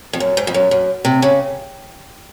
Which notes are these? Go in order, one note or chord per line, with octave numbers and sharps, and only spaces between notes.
F2
F#2
G#2
F2
F#2
F#2
C3
C#3